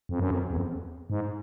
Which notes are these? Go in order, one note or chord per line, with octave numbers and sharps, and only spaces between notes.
F2
F#2
F2
E2
F2
G#2